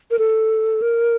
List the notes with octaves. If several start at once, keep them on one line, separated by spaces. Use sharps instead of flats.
A#4
A4
A#4